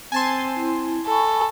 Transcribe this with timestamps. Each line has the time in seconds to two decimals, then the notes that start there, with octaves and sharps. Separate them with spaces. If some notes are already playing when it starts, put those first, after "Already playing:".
0.12 C4 G#5 A5 C6
0.56 E4
1.07 A4 G#5 B5 C#6